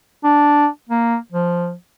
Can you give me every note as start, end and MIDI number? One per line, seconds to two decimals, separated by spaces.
0.24 0.66 62
0.89 1.16 58
1.32 1.73 53